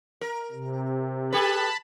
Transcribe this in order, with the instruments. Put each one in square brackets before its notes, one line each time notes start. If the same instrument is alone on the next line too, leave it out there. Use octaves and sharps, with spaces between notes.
[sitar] A#4
[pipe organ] C3
[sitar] G4 A4 B4 [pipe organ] A5 B5